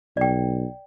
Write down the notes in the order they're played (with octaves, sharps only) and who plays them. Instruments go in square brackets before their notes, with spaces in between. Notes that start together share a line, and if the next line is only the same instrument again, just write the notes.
[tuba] B1 [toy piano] D5 G5